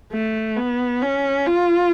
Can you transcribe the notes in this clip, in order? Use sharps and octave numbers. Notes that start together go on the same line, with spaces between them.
A3
B3
C#4
F4